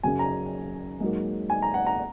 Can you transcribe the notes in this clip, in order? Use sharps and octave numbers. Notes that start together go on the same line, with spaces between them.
F#2 C#3 F#3 G#5
A#5
G#2 F#3 A#3
G#5
A#5
F#5
A#5